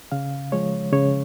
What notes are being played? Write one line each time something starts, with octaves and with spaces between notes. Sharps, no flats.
C#3 F5
F3 G#3 C#5
C#3 C#5